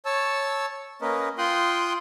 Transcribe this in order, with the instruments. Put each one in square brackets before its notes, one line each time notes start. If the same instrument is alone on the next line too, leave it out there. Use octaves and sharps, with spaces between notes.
[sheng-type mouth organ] C#5 A5 E6
A#3 C#4 A#4 B4 D#5
F4 G5 C6 D#6 F#6